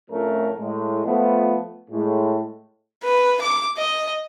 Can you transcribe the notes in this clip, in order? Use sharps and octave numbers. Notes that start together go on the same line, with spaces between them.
F2 A2 F3 A3 C#4 A#4
A2 G#3
F3 A3 B3
A2 G#3
B4
D6
D#5